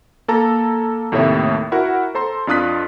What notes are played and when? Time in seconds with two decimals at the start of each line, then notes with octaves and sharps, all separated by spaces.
0.28 A#3 A4 A5 A#5
1.12 D#2 A2 C3 A3 C#5 E5
1.72 E4 F#4 A#4 F#5
2.15 A4 C5 A#5 C6
2.47 F2 D4 F4 D#6 F#6 B6